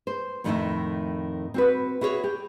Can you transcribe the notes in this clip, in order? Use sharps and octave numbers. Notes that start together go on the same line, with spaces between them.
C5
F2 A2 D#3 G#3 A3 E4
C4 F#4 B4
E4 F#4 G#4 A#4 C#5
G4